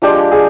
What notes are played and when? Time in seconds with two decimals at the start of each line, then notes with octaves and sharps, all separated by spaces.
0.02 F3 G#3 D4 G4
0.32 G#4